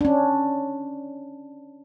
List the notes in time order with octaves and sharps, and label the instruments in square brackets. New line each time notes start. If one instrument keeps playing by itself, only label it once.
[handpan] C#4 D4